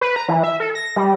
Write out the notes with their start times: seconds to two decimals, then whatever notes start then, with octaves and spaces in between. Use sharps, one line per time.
0.01 B4
0.16 A#5
0.28 E3
0.44 E5
0.60 A4
0.75 A#6
0.96 G3